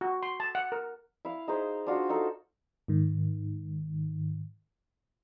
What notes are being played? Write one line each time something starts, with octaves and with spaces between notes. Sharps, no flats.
F#4
C6
A5
F#5
A#4
E4 F5
D#4 G#4 C5 D#5
D4 F4 F#4
D#4 A4
G#2 D#3